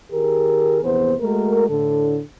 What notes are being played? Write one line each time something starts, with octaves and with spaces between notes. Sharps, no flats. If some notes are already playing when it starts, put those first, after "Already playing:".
D#3 G4 G#4 A#4
A#1 E2 C3 B3 B4 C5
G#3 A3 F#4 A#4
A2 D3 A4